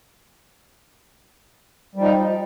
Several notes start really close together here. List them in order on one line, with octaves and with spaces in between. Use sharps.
G3 F3 D#4